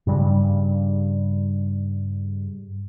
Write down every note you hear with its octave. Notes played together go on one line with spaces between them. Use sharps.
G2 C#3 G3